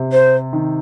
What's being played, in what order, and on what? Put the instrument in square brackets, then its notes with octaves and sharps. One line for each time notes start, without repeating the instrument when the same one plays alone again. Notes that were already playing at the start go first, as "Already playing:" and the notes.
Already playing: [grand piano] C3
[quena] C5
[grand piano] D#3